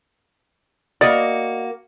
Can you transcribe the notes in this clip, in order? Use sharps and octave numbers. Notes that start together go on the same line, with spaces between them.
A#3 F#4 D5 D#5